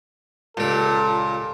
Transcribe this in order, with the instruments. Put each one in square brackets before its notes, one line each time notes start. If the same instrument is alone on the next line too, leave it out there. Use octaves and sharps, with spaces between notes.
[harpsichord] C#2 G4 [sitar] A#2 [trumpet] A4